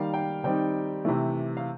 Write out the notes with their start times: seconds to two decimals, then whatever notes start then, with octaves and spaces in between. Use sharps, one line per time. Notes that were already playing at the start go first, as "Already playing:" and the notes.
Already playing: D#3 G3 A#3 F5
0.14 G5
0.44 D#3 G3 C4 D#4 G5
1.05 C3 E3 A3
1.57 F5